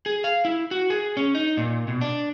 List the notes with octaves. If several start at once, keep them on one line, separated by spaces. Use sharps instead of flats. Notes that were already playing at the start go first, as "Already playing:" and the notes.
G#4
F5
E4
F#4
G#4
C#4
D#4
A#2
B2
D4